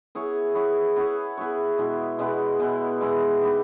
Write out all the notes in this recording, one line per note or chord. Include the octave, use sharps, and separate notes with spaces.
B3 E4 G#4 C#5
B3 E4 G#4 C#5
B3 E4 G#4 C#5
B3 E4 G#4 C#5
B2 G#3 B3 E4
B2 G#3 B3 E4
B2 G#3 B3 E4
B2 G#3 B3 E4
B3 D#4 G4